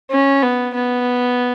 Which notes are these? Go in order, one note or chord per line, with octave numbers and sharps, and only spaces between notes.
C#4
B3
B3